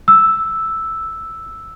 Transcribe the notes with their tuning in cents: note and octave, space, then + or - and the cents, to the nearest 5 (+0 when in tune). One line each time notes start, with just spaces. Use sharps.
E6 +0